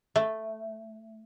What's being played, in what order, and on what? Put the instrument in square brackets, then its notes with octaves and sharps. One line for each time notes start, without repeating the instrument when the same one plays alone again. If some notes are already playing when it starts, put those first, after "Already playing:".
[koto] A3